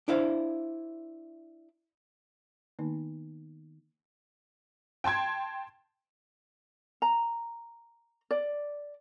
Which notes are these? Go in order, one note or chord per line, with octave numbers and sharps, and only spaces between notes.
D4 E4 C5 F5
D#3 A#3 B3 D#4
G5 A5 C6 G#6
A#5
D5